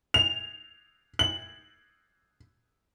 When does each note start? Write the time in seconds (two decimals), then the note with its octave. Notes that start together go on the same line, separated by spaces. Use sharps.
0.14 F7
1.19 F#7